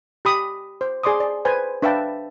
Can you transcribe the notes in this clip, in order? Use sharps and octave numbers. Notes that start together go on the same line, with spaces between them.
G4 B5 D#6
C5
G#4 D5 C6 D6 D#6
D5
B4 C5 G#5
D4 B4 E5 F5 G5 A5